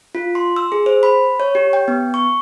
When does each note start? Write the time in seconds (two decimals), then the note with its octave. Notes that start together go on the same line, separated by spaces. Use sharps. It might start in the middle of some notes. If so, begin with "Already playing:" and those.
0.15 F4
0.35 C6
0.56 E6
0.72 G#4
0.86 C5
1.03 B5
1.40 C#5
1.55 G4
1.73 G5
1.88 B3
2.14 C#6